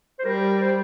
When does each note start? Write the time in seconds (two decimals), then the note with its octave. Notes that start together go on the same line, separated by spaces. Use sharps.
0.19 C5
0.25 G3 A#4
0.61 C5